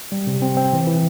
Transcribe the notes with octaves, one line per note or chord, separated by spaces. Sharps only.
G3
C3
C4
C4
E3
E3